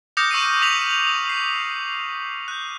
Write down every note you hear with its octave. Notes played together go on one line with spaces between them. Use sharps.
D6 D#6 F6 G6 A#6 C#7
C#6 E6 C7 D#7
D6 B6 F7 F#7
D#6
C7
F#6 G6